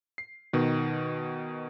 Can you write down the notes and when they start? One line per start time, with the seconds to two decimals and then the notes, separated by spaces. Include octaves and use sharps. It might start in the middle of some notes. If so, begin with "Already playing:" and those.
0.18 C7
0.53 B2 D#3